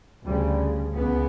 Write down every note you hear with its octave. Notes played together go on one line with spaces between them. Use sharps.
D2 C#3 G3
C#2 C#3 B3